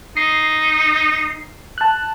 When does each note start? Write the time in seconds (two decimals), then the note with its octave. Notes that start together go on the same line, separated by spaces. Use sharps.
0.17 D#4 C7
1.78 A5 F#6